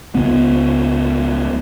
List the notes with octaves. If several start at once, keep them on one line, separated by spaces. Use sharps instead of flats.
C#2 C#3 B3